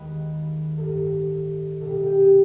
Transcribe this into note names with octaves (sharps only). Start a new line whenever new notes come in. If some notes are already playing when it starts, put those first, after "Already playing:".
Already playing: D#2 D#3 G#3 B4
A1 G2 D#3 A4
C2 B2 G3 A4
G#4
G4
G#4